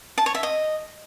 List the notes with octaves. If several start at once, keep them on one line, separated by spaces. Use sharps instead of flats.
A5
C#5
E5
D#5